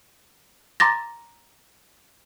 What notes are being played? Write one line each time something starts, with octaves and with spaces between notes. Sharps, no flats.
A#5 C6 D6 A6 A#6